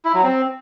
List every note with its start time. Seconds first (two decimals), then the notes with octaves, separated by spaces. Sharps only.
0.05 E4
0.14 F#3
0.23 C4